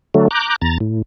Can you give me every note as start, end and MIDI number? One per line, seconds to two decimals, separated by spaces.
0.14 0.28 50
0.14 0.28 54
0.14 0.28 57
0.31 0.56 82
0.31 0.56 86
0.31 0.56 90
0.31 0.56 91
0.62 0.78 40
0.62 0.78 82
0.62 0.78 93
0.80 1.02 45